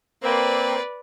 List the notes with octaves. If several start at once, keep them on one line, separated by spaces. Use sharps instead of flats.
A#3 C4 B4 D5